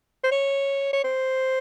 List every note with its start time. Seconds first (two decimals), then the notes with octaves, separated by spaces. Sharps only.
0.24 C5
0.31 C#5
0.93 C#5
1.04 C5